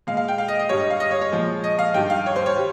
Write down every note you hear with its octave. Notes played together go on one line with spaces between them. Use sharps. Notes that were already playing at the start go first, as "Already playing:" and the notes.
A#2 G#3 F5
F5
G5
F5
D#5
D#5
G2 G3 C#5
D#5
F5
D#5
C#5
C#5
A#2 F3 G#3
D#5
F5
G2 D#3 G3 G5
F5
C#5
C5
C#5
G3